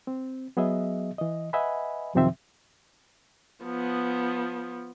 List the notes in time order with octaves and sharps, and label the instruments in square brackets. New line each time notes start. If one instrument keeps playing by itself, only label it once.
[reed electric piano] C4
F#3 B3 G#4 D#5 E5
E3 D#5
B4 D#5 E5 F#5 G#5 B5
F#2 C3 D#3 F3 C4 E5
[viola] F3 B3